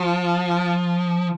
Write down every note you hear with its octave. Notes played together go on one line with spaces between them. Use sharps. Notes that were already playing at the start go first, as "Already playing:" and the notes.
Already playing: F3